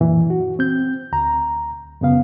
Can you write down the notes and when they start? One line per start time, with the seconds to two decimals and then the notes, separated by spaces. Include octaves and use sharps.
0.01 F#2 A#2 E3
0.30 F#4
0.59 C4 G6
1.12 D2 A#5
2.02 F#2 C#3 B3 F5